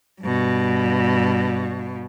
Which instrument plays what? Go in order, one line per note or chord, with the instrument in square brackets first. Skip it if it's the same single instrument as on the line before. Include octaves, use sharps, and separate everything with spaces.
[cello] G2 B2